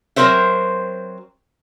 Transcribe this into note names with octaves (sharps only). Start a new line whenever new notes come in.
F#3 C4 A#4 C5 E5